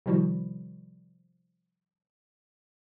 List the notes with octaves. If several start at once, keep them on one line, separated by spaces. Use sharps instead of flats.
C3 D#3 F3 G3 E4 F#4